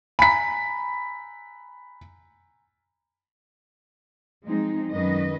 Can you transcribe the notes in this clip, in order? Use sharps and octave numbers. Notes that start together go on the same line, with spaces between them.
G#5 A#5 B5 B6
F3 G#3 C4 D#4
F#2 D#3 F#3 B4 D#5